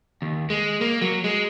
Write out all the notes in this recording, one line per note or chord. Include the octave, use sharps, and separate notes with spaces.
D#2
G#3
A#3
F#3
G#3